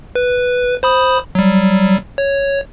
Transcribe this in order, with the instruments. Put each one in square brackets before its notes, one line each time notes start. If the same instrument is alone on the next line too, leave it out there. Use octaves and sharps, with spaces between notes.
[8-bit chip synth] B4
C5 B5 D#6
F#3 G3
C#5